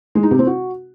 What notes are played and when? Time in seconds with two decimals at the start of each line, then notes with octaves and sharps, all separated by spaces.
0.15 G#3
0.23 D#4
0.31 C3
0.39 C4
0.47 F#4